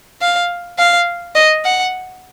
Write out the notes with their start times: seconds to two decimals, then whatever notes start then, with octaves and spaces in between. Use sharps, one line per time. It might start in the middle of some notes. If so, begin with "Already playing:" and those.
0.21 F5
0.79 F5
1.36 D#5
1.65 F#5